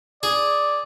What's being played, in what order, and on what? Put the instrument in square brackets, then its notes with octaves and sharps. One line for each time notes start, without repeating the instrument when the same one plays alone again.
[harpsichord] G#4 [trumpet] D5